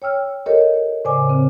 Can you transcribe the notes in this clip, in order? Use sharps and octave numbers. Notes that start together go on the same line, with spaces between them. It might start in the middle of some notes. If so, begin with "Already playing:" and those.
C#5 G5 E6 F6
G4 A4 A#4 C#5 D#5
A2 C#3 C5 D5 G#5 D6
C#3 C4